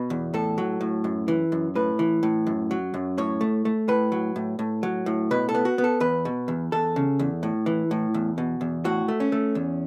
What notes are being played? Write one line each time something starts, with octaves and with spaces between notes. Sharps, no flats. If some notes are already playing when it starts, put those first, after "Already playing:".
Already playing: B2 B4
E2
A2 A4
F#3
A2
F#2
E3
F#2
A2 B4
E3
A2
F#2
F#3
F#2
A2 C#5
A3
A3
A2 B4
F#3
A2
A2
F#3
A2
B2 B4
A4
B3
F#4
B3
A4
E2 B4
B2
E2
E2 A4
C#3
E2
A2
E3
A2
E2
B2
E2
A2 F#4
A3
C#4
A3
E2